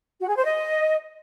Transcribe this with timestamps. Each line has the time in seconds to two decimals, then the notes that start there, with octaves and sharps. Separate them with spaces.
0.20 F#4
0.28 G#4
0.36 C5
0.45 D#5